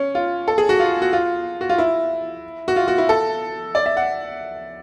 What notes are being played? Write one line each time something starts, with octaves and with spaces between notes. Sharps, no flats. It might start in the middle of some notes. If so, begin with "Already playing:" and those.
Already playing: C#4
F4
A4
G#4
F#4
F4
F#4
F4
F#4
F4
E4
F#4
F4
F#4
E4
A4
D5
E5
F#5